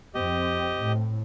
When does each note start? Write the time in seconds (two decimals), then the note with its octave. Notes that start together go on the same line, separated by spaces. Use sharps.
0.14 F2 C4 G4 D#5
0.80 A2